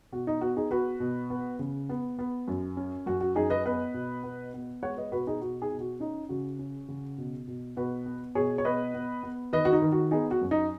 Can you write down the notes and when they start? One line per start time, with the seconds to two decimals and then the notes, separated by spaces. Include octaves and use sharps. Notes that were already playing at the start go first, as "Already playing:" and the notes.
0.12 B2 F#4
0.27 D#4
0.41 B3 F#4
0.56 D#4 G#4
0.71 B3 F#4 B4
1.00 B2
1.30 B3
1.59 C#3
1.89 B3
2.19 B3
2.48 F#2
2.77 C#4
3.06 F#2 F#4
3.21 F#4
3.36 F#2 D#4 G#4
3.50 B4 D#5
3.65 B3 B4 D#5
3.94 B2
4.23 B3
4.54 B3
4.82 G#3 C#5 F#5
4.97 B4 D#5
5.12 B2 F#4 B4
5.27 D#4 G#4
5.41 B2 F#4
5.61 D#4 G#4
5.71 B2
5.80 F#4
6.00 C#4 D#4
6.29 C#3 F#4
6.59 C#4
6.88 C#3
7.18 B2
7.48 B2
7.76 B2 F#4 B4
8.06 B3
8.35 B2 G#4 C#5
8.58 C#5
8.65 B3 B4 D#5
8.94 B3
9.23 B3
9.53 D#3 B4 D#5
9.65 F#4
9.73 D#4
9.82 D#3
9.92 F#4
10.11 B3 D#4 G#4
10.31 F#4
10.41 F#2
10.51 D#4